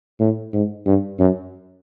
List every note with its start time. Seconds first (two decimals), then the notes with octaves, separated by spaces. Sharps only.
0.20 A2
0.53 G#2
0.86 G2
1.19 F#2